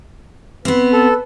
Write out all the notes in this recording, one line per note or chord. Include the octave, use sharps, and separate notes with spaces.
B3 C4 B4
A4